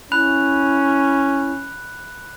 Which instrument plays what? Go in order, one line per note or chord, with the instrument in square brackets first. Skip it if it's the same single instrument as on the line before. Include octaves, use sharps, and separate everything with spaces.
[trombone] C#4 [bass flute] E4 [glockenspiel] B5 F#6 F7